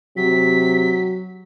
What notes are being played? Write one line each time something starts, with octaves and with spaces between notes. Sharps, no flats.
C3 F#3 B6